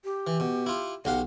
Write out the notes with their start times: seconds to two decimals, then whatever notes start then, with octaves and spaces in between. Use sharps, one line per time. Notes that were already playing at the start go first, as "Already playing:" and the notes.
0.04 G4
0.27 E3
0.40 B2
0.66 E4 F4
1.05 B1 G4 F5 F#5